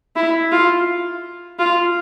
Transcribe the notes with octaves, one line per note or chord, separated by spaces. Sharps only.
E4
F4
F4